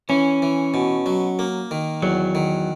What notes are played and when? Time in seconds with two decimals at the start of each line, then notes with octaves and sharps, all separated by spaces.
0.09 E3 C#4
0.42 E3
0.74 B2
1.06 F#3
1.39 A#3
1.71 D#3
2.02 E2 F#3
2.35 D#3